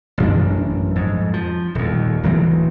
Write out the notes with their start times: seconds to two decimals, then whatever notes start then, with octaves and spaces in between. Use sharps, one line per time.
0.18 A1 F#2 D4
0.96 F2 G#2
1.34 F3
1.75 D#1 D#2
2.23 D1 D2 E3 C4